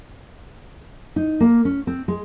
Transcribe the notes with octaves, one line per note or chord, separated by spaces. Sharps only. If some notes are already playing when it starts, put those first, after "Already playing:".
D#4
A#3
C#4
C4
G#3